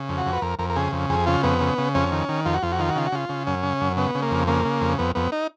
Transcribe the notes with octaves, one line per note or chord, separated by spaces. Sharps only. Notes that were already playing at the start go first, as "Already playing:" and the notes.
Already playing: C#3
F2
F#4
F2
B4
F2 A#4
F2 A#4
A#4
C#3 G#4
F2
F2 G#4
C#3 F4
F2 B3
C#3
C#3
F2 C#4
D#3
D#3
F2 F4
F#4
F2 F4
F#4
D#3 F4
F#4
C#3 F4
F#4
C#3 F4
C#3
F#2 C#4
C#3
F#2
C#3 B3
C#3
A#3
F2
C#3 A#3
C#3
F2
F2 B3
F2 B3
D#4